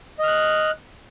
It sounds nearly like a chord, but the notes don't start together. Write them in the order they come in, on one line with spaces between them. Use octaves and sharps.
D#5 F6 F#6